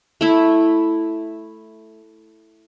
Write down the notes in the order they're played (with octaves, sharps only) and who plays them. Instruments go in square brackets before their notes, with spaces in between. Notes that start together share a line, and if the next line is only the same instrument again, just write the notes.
[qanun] A3 E4